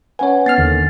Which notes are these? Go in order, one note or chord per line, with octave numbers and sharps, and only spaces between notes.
C#4 B4 C#5 F#5 G#5
B3 F6 A6 C7
D#2 D3 D#3